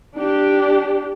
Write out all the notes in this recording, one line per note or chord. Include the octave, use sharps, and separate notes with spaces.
D4 G4